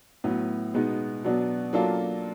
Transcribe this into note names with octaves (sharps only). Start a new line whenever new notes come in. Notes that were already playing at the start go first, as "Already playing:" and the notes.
A2 F#3 B3
B2 G#3 B3 D#4
B2 F#3 B3 D4
F#3 A#3 D4 F4 A4